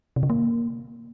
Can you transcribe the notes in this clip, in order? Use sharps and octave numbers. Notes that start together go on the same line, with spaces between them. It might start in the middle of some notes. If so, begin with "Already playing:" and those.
C3
C#3
A#3